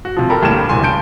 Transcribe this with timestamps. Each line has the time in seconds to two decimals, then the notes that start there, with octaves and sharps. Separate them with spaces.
0.05 F#4
0.16 C3 F3
0.29 G4 A4 A#4 B5
0.42 D2 A2 G3 A#3 E7
0.69 D1 C2 G3 G#5 C6
0.82 C#2 A5 G6 D7